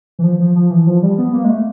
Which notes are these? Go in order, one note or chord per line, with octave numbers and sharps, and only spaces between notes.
E3
F3
F3
F3
E3
F3
G3
B3
A#3
G#3
A3